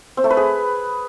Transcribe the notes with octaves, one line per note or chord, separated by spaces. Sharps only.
C4
A3
B4
G#4